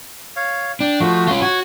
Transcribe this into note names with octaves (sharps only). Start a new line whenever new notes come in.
C#5 F5
D4 G5
F3 A3 F#4
C#4 F4
F#4 C#5